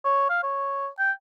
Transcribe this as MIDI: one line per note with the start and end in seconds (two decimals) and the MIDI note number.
0.05 0.29 73
0.30 0.41 77
0.43 0.87 73
0.99 1.11 79